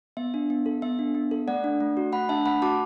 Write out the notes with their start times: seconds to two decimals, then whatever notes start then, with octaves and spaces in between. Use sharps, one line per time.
0.17 B3 E5
0.34 D4
0.50 B3
0.66 A4
0.82 B3 E5
0.99 D4
1.15 B3
1.31 A4
1.48 A3 D5 F#5
1.64 D4
1.80 A3
1.97 F#4
2.12 A3 F#5 B5
2.29 D4 E5 A5
2.46 A3 F#5 B5
2.62 F#4 A5 D6